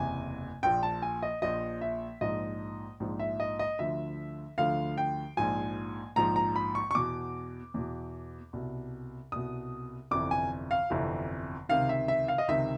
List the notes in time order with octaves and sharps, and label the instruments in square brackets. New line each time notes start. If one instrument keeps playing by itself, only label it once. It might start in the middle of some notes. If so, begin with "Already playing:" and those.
Already playing: [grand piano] F#1 E2 C3 G#5
A#1 A#2 F3 G5
A5
G#5
D#5
A#1 A#2 F3 D#5
E5
A#1 G#2 F3 D#5
A#1 G#2 F3
E5
D#5
D#5
D2 D3 F3 E5
D2 D3 F3 F5
G5
A#1 G#2 F3 G#5
A#1 G#2 F3 A#5
A#5
B5
C#6
C#6
E2 B2 D6
E2 B2
C2 B2
C2 B2 D#6
G1 F2 C3 E3 D6
G#5
F5
G1 F2 C3 E3
C#2 C3 D#3 F5
E5
E5
F5
D#5
C#2 C3 D#3 E5